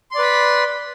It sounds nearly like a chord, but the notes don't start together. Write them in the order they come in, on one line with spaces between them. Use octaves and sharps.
C6 D5 B4 B5